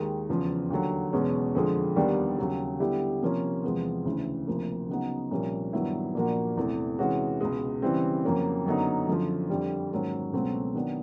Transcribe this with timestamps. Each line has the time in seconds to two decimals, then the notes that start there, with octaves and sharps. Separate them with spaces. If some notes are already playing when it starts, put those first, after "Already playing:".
Already playing: D#2 D#3 G#3
0.29 E2 C#3 F3
0.70 D#2 D3 F#3
1.13 E2 B2 G#3 C#4
1.55 F2 D3 F3 G#3
1.96 D#2 D#3 G3 B3 D4
2.38 D#2 C#3 F#3
2.80 D3 G3 B3 E4 G4
3.22 C3 F3 A#3 C#4
3.64 E2 C3 F3 G#3 B3
4.05 D2 C#3 E3
4.47 D2 C3 F3 A#3
4.89 C#3 F#3 B3 D#4 F#4
5.31 C2 A#2 F3 A#3 C#4
5.73 G2 D#3 F#3 B3 E4
6.15 A#2 F3 A#3 D4 F#4
6.57 E2 C3 E3 A3
6.99 C3 E3 G#3 C#4 F#4
7.40 C#2 B2 G#3
7.82 C#3 E3 G3 C4
8.24 F2 C#3 F#3 A#3 C#4
8.66 F#2 D3 F#3 B3 D#4
9.07 F#2 D3 F3
9.50 F2 D3 G3
9.92 G#2 D#3 F#3 A#3 C#4
10.33 C#2 B2 F#3 A3 C4
10.75 D#3 F#3 B3 D4